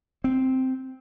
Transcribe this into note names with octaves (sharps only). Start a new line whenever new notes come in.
C4